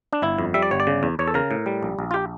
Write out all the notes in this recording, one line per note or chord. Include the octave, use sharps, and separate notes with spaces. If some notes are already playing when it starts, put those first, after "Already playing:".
D4
G1 E4
F2
G3 E5
D5
G1 C#5
D5
C#3
E2
E2 C#5
A4
C#3 A#4
A2
G3
A#1
A#1
F4
G4